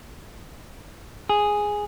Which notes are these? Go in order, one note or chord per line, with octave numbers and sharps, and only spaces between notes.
G#4